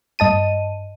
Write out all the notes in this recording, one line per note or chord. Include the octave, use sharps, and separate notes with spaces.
G2 D#5 A5 D#7